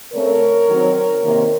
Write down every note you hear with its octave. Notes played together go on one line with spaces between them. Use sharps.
C#3 A3 C4 A#4 C#5
D#3 F#3 C4
C3 D#3 A#3